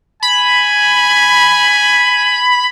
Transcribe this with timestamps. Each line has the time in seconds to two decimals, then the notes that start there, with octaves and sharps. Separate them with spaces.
0.22 G#5 B5